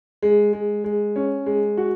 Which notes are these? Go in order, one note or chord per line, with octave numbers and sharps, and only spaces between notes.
G#3
G#3
G#3
C#4
G#3
F#4